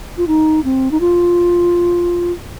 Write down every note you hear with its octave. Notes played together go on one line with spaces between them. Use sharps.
F4
D#4
C4
D#4
F4